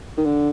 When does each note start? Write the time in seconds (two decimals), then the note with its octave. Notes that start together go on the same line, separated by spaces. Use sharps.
0.17 D#3
0.25 D3